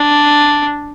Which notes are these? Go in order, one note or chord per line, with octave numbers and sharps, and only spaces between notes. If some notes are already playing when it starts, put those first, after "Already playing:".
Already playing: D4